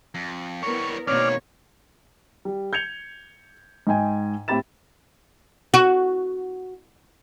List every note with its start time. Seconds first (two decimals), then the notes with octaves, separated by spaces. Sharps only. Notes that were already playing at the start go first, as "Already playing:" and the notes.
0.15 F2
0.63 G3 B3 E4 A#4 C#5 C#6
1.07 G#2 B2 D#3 A#3 C4 C#5 D5 F6
2.45 G3
2.73 G6 G#6 C#7 F7
3.87 G#2 D#5 G5 G#5
4.48 A2 C4 G4 B5 A6 E7
5.74 F#4